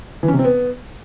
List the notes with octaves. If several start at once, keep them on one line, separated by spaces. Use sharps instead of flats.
E3
C#4
C3
C4
B3